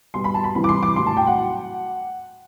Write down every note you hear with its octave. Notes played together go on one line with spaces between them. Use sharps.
B2 G3 C6
B5
A5
B5
C3 E3 G3 B5
D6
C6
D6
A2 F#3 C6
A5
G5
F#5